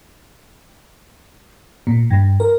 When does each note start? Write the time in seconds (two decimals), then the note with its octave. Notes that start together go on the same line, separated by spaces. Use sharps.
1.87 A#2
2.11 G2
2.40 A#4